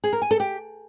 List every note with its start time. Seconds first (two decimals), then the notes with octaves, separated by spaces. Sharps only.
0.04 G#4
0.13 A#4
0.22 G#5
0.31 A4
0.40 G4